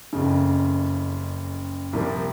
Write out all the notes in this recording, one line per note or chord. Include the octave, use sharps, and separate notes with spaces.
F#1 F2 C#3
C2 C3 F3 A#3